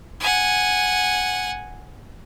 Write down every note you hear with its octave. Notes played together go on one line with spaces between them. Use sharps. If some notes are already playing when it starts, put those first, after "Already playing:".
F#5 G#5